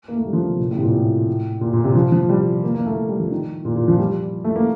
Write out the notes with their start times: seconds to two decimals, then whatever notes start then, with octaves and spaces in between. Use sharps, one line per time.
0.08 A#3
0.16 A3
0.26 G3
0.33 F3
0.42 D3
0.51 C3
0.59 A#2
0.71 A2
0.77 C3
0.82 A#2
0.93 A2
1.61 A#2
1.73 A#2
1.84 C3
1.95 F3
2.12 F3
2.29 G3
2.64 A#3
2.74 A#3
2.86 A3
3.09 G3
3.20 F3
3.31 D#3
3.65 A#2
3.76 A#2
3.88 F3
3.99 G3
4.44 A3
4.56 A#3